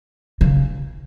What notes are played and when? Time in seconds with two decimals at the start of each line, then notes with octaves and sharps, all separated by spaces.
0.41 C#3